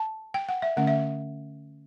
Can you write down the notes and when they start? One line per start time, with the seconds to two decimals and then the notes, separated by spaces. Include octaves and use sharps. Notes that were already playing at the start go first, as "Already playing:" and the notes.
Already playing: A5
0.34 G5
0.49 F#5
0.62 E5
0.77 D3 A3 C#4 F#5
0.87 E5